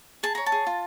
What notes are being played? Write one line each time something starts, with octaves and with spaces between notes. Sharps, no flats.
G#4 A5
C#5 A#5
A5
G#4
F4